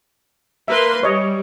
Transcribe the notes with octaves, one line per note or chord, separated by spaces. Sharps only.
A#3 B4 E5 C6
G3 C#5 D#5